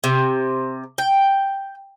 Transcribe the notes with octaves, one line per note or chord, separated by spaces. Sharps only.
C3
G5